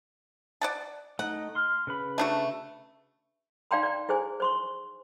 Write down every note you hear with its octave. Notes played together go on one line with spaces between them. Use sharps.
D5 F#5 A5
A3 D#4 F#5
C6 F6
C#3 B4 B5
A3 D4 F#4
D#4 D5 F5 G5 A#5 C6
D5 G5
E4 G#4 C5 G#5
C5 C6 C#6